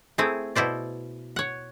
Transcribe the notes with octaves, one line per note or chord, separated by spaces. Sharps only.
A3 C4 E4 G#4
B2 E4 C5 D5
C#5 F#5